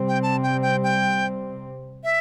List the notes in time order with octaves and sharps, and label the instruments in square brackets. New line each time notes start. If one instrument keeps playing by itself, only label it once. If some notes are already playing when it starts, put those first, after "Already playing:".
Already playing: [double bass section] C3 G3 C4
[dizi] G5
A5
G5
G5
G5
E5